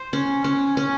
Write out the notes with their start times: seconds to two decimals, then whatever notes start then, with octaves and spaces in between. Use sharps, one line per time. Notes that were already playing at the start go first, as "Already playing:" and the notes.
Already playing: C5
0.13 C#4
0.44 C#4
0.77 C#4